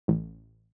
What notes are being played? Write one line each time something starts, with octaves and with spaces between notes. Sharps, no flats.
A1